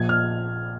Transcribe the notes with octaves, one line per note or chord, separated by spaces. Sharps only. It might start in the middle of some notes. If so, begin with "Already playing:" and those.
Already playing: A#1 A#2 F3 G#6
F6